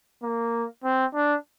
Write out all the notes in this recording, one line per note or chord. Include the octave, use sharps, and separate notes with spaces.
A#3
C4
D4